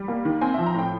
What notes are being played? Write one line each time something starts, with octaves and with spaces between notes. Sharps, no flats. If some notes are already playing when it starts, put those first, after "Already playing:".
Already playing: G3
A#3
D#3
C4 G#5
E5
F3
A#5
A2 G5